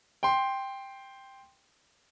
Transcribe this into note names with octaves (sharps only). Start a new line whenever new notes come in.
G5 C6